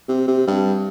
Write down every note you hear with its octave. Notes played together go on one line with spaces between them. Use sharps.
C3
C3
G2